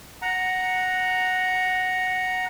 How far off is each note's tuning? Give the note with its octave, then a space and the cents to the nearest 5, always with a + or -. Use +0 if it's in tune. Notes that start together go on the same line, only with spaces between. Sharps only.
F#5 +0 A#5 +0